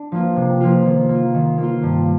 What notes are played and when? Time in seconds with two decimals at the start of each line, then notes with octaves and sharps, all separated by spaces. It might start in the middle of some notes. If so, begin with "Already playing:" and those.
Already playing: D4
0.12 F3 A#3 F4
0.36 C3
0.60 F3 A#3 F4
0.86 D#3
1.09 A#3
1.14 F4
1.34 D#3
1.58 A#3
1.63 F4
1.83 G2